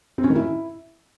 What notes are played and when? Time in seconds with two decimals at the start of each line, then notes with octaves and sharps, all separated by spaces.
0.18 C4
0.24 C#4
0.30 D#3
0.36 E4